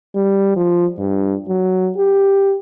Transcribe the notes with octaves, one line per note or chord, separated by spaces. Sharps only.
G3
F3
G2
F#3
G4